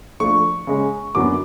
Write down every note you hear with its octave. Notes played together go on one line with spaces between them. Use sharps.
F3 A3 D4 C#6
C#3 G#3 C#4
F#2 D3 F#3 B3 D6